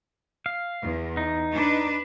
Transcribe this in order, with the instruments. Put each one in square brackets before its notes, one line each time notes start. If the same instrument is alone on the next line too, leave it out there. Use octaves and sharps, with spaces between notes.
[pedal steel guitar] F5
[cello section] E2
[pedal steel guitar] D#4
[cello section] D4 B4